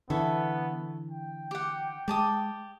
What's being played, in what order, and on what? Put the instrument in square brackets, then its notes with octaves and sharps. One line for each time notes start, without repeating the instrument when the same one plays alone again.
[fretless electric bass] D3 E3 [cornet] B3 [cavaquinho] A4 C#5 E5
[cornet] G5
[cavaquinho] G4 F#5
[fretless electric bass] G#3 [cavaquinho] G4 A5 D#6